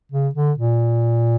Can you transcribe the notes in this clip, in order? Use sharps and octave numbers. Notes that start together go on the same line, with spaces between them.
C#3
D3
A#2